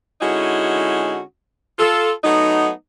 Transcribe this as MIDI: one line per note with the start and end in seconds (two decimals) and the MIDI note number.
0.21 1.20 50
0.21 1.20 56
0.21 1.20 61
0.21 1.20 63
0.21 1.20 64
0.21 1.20 66
1.79 2.11 65
1.79 2.11 69
2.24 2.70 54
2.24 2.70 57
2.24 2.70 59
2.24 2.70 63